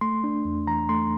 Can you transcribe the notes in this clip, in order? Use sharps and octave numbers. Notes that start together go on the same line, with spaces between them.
A3 C6
D4
E2
E3 A#5
A3 C6